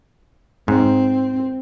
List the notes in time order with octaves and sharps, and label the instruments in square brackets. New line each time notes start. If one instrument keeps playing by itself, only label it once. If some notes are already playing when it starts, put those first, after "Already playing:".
[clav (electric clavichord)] G#2 [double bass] C4